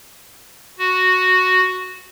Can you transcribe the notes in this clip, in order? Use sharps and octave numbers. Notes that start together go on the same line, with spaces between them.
F#4